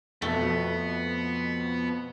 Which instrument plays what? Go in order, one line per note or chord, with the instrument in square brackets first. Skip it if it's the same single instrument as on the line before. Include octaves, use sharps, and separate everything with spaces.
[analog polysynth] F2 B2 [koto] A3 [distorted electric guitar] B3